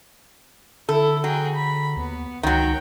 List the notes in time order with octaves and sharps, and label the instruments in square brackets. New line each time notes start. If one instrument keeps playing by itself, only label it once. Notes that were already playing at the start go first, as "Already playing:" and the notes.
[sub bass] D3 [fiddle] E4 [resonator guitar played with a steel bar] A4
[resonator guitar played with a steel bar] F#3 [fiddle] G#4 G5
[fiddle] B5
[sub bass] D#2 [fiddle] B3
[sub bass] C#2 [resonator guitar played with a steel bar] D#3 F#3 [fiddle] C#5 G5